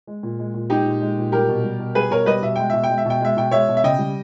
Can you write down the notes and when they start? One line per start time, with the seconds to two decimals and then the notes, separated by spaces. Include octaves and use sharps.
0.07 G#3
0.23 A#2
0.39 G#3
0.54 A#2
0.69 G#3 D#4 G4
0.85 A#2
1.01 G#3
1.18 A#2
1.32 G3 G4 A#4
1.49 B2
1.64 G3
1.79 B2
1.95 G3 G#4 B4
2.11 B2 A#4 C#5
2.26 G3 B4 D#5
2.42 B2 E5
2.56 G#3 G5
2.70 B2 E5
2.84 G5
2.90 G#3
2.98 E5
3.05 B2 G5
3.21 G#3 E5
3.37 B2 G5
3.51 G#3 C#5 E5
3.69 B2
3.77 E5
3.84 C#3 D#5 G5
3.99 G3